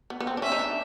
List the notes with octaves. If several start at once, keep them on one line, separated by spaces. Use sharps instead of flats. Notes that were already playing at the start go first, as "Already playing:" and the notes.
B3
B3
C4
D4
C#4 E5
D#4
D4